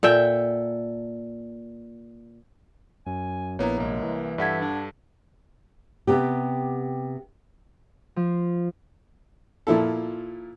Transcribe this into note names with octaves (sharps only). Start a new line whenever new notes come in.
A#2 A4 E5 G5
F#2 G#5
A#1 A#3 B3 E4 C#5 A#5
C2 G#3 A#3
E3
G2 A4 D5 E5 F#5 G#6 B6
D4
C3 B3 G4
F3
A#2 F3 E4 A4